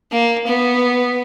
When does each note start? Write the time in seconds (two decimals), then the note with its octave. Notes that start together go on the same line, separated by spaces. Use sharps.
0.12 A#3
0.48 B3